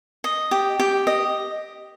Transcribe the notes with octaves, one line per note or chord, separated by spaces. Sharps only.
D#5
G4
G4
D#5